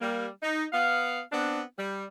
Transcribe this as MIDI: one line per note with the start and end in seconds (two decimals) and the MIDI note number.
0.01 0.27 55
0.01 0.27 58
0.43 0.64 63
0.73 1.21 59
0.73 1.21 77
1.32 1.61 59
1.32 1.61 60
1.32 1.61 62
1.79 2.04 55